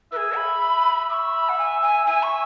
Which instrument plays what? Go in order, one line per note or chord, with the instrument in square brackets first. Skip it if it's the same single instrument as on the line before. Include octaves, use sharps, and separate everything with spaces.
[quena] B4 [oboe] E5
[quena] G#4
B5
[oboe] E5
[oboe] E5 [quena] D#6
[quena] C#6
B5
F#5
G#5
G#5
[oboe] E5 [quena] G#5
[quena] C#6